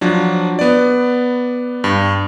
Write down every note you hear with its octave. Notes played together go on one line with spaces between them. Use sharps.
F3 F#3 D4
B3 D5
G2